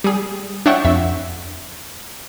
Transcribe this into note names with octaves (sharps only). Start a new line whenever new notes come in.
G3 G#4
D4 C#5 E5 F#5 G5 C#6
F2 E5